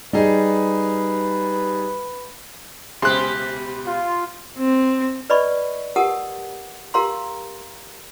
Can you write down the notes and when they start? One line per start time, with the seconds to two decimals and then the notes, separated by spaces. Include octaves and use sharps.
0.13 G3 D#4 G#4 B4
3.02 C#2 B2 G4 G#4 C5 C6 F#6
3.86 F4
4.59 C4
5.30 B4 D5 D#5 B5 C#6
5.96 G4 A#4 F#5 A5 D#6
6.94 G4 A#4 F5 A#5 C6